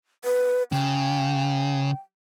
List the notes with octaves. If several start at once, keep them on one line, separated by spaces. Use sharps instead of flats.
B4
C#3 G5